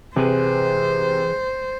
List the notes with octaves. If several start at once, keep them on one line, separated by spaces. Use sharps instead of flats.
C3 E3 G#4 B4 C5